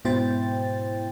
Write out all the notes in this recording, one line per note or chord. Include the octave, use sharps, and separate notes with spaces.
G#2 B2 E4 C5 G5 A6